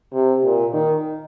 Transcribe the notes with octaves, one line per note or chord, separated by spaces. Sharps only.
C3
A#2
D#3